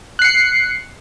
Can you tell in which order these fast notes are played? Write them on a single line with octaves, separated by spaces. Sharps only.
F#6 C7 C#7